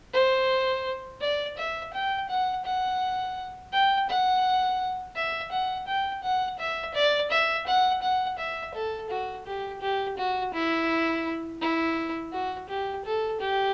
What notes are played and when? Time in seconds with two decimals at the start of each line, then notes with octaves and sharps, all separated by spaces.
0.13 C5
1.21 D5
1.57 E5
1.94 G5
2.29 F#5
2.65 F#5
3.73 G5
4.09 F#5
5.16 E5
5.52 F#5
5.87 G5
6.23 F#5
6.59 E5
6.94 D5
7.31 E5
7.67 F#5
8.02 F#5
8.38 E5
8.75 A4
9.10 F#4
9.46 G4
9.82 G4
10.18 F#4
10.54 E4
11.62 E4
12.32 F#4
12.69 G4
13.05 A4
13.40 G4